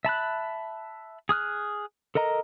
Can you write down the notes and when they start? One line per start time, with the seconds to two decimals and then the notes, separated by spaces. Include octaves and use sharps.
0.05 E5 A5 B5 F#6
1.29 G#4 D#6 F6 F#6
2.15 A4 A#4 D#5 A#5